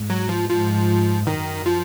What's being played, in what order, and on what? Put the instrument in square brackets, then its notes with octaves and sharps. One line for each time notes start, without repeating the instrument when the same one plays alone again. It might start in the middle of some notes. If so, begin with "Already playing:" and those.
Already playing: [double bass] G#2
[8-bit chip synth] F#3
F3
[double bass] G#2 [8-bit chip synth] F3
[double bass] F#2 [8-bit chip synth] D#3
[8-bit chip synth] F3